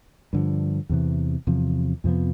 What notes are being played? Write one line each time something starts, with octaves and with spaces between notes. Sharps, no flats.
G2 D3 F3
E2 C3 E3
E2 C3 F3
F2 C3 F3 B3